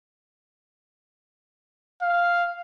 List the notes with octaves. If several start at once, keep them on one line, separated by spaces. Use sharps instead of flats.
F5